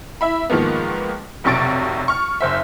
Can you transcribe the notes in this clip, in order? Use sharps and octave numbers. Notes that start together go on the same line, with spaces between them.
E4 E5 B5
G#2 D#3 F3 A#3 B3
F1 B1 C3 C#6 A6 D7
C#6 F6
F#1 C5 E5